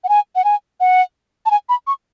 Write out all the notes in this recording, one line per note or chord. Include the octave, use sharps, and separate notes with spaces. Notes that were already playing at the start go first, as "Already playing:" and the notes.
F#5
G#5
F#5
G#5
F#5
A5
G#5
B5
C#6